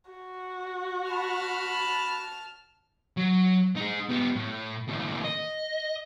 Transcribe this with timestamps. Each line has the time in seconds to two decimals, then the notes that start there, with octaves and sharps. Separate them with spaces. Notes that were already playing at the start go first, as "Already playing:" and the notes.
0.10 F#4
1.11 A5 B5 F6
3.17 F#3
3.76 D#4 G#4
4.09 B3 G4
4.36 A2
4.88 D#2 A2
5.24 D#5